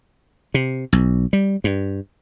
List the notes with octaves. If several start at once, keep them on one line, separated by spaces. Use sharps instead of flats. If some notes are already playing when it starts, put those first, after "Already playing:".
C3
B1
G3
G2